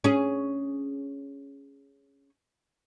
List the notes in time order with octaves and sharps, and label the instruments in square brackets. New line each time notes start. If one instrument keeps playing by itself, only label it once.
[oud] C#4 G#4